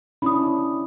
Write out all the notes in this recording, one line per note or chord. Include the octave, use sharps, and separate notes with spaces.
C#4 D4 E4 B5 D#6